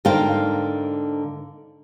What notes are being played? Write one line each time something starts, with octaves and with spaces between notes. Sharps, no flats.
G#2 D3 A#3 C5 F5 G5